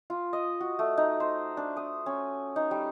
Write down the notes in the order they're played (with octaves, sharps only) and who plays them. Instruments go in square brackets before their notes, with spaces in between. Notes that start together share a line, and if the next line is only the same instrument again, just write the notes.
[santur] F4
D#5
F#4
A3
D#4
C5
D4
D#6
C#4
D#4
G3